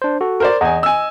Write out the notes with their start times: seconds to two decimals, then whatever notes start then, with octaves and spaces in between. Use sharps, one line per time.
0.02 D4 C5
0.21 F#4 A4
0.40 A#4 C5 D5
0.61 E2 D#5 G#5
0.83 G#5 E6